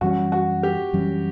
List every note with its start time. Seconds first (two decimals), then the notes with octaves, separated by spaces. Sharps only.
0.01 F#2 E3 G3 C#4 F#4
0.32 F#4
0.63 G4
0.93 F#2 E3 G3 C#4